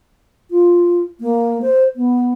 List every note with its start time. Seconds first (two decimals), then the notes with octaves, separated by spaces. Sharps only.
0.51 F4
1.21 A#3
1.62 C5
1.96 B3